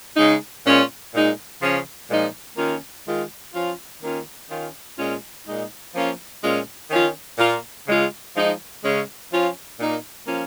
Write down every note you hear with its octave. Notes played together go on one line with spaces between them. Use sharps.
C#3 G#3 D#4
A#2 G#3 C#4 F4
A#2 G#3 D#4
C#3 F3 C#4
A#2 F3 G#3 D#4
D#3 A#3 C#4 F4
D#3 G#3 F4
F3 C#4 F4
D#3 A#3 C#4 F4
D#3 C#4 F4
A#2 G#3 C#4 F4
A#2 G#3 D#4
F3 A#3 C#4 F4
A#2 G#3 C#4 F4
D#3 C#4 F4
A#2 A#3 F4
C#3 G#3 F4
F3 G#3 D#4
C#3 G#3 C#4
F3 C#4 F4
A#2 A#3 D#4
F3 A#3 C#4 F4